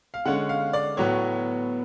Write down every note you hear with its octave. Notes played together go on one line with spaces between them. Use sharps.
F5
D3 G#3 C#4 F#5
F5
D5
A2 F#3 B3 C#5